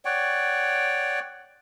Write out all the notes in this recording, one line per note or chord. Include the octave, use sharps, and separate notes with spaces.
C#5 D5 F#5 G5